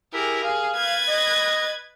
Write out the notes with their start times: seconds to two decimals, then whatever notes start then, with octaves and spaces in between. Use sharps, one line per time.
0.14 E4 G4 G#4 A#4
0.43 G#4 F5
0.78 B4 G#6 A6
1.08 D#5